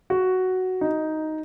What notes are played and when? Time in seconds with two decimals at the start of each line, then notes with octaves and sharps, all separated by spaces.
0.10 F#4
0.81 D#4